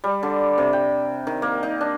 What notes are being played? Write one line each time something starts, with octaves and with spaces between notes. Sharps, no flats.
G3
D3
C3
G5
D#3
A#3
D#4
D4